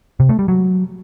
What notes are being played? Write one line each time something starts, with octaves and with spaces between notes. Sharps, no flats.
C3
A3
G3
F#3